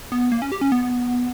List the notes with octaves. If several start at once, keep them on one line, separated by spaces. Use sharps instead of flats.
B3
A#3
C#4
G4
C#4
B3